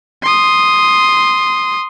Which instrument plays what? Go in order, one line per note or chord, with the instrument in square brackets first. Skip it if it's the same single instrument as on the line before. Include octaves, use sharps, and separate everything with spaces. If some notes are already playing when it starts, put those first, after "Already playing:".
[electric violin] C6 D#6